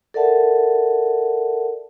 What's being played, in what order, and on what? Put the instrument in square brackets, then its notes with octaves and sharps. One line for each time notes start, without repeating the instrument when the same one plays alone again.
[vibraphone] A4 A#4 D5 E5 F#5 A5